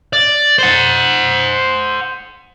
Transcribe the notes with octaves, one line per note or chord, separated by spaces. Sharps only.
D5
C5 F#5